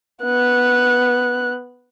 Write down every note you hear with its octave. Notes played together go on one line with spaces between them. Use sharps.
B3 F#6